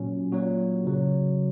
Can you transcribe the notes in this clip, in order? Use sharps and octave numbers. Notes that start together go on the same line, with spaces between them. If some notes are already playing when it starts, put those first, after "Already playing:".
Already playing: A#2 F#3 C#4
A#2 F#3 F#4
C#3 F#3